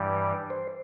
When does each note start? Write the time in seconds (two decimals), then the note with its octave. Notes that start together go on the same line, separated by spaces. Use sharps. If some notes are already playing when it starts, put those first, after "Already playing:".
Already playing: G2 E3 G3 D5
0.50 C5